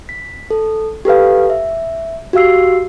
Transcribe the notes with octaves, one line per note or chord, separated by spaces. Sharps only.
B6
A4
G4 A4 B4 F5
E5
F#4 G4 F5 E6 C7